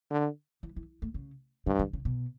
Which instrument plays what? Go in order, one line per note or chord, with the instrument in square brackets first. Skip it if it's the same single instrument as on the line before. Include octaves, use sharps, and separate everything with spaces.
[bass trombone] D3
[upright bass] E3
E3
A3
C#3
[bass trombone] G2 [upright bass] D3
[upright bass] D3
C#3
B2